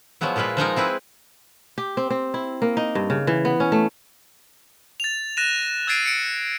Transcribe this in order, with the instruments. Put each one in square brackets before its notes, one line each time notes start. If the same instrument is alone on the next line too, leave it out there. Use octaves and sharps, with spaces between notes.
[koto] F3 F#3 G#3 B3 E4
A#2 G#3 E4 F4 B4
F3 G#3 D#4 A#4
C4 E4 G#4 B4
[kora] G4
C4
C4
E4
A#3
D#4
G2
C#3
E3
B3
C#4
A3
[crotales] A6 F7
F#6 A#6 D#7 E7
E6 G#6 A6 C7 D7 D#7
C#7 D7